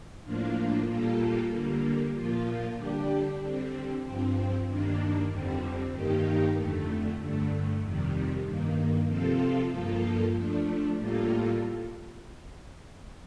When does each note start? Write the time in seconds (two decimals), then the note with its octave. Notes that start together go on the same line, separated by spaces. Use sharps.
0.24 A2 F3 A#3 D4 F4
0.88 A#2 G3 A#3 F4 A4
1.51 D3 G3 A#3
2.14 A#2 F3 A#3 F4
2.77 D3 G3 D4 G4
3.40 D3 G3 C4
4.03 G2 F3 C4
4.66 G2 D#3 A#3 D4
5.29 F2 D3 G3 C4
5.92 G2 D#3 A#3 D#4 G4
6.55 F2 D3 A3
7.19 G2 D3 A3
7.81 F2 C3 D#3 G3
8.44 G2 D#3 A#3
9.08 C3 F3 C4 F4 A4
9.71 G2 F3 A#3 F4 A4
10.34 F3 A3 D4
10.97 A2 G3 A#3 F4 A4